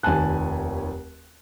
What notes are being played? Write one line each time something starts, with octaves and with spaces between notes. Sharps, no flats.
F1 D#2 G#5 A5 F#6